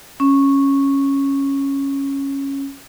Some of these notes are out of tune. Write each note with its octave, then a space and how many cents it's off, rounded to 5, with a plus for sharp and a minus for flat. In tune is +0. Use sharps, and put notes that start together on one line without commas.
C#4 -5